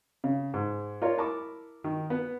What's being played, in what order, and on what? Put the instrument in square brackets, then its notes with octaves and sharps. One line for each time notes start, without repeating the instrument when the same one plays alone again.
[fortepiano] C#3
G#2
F4 A#4 C#5 D5
E4 A#4 A5 B5 C#6 D6
D#3
B3